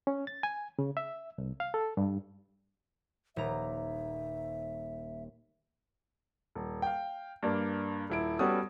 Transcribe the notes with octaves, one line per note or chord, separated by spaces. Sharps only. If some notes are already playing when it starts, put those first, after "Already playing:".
C#4
A6
G#5
C#3
E5
C2
F5
A4
G2
D#1 E5 A#5
D#1
F5 G5
G2 A#3 D4
D#1 E4 D7
G3 B3 C#4 F#4 A4 D#6